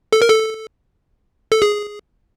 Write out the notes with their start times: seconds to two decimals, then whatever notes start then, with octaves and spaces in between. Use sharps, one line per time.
0.13 A4
0.22 A#4
0.29 A4
1.52 A4
1.62 G#4